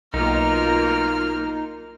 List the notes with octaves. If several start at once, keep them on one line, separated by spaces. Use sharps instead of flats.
B1 A#3 D#4 F4 A#4 F6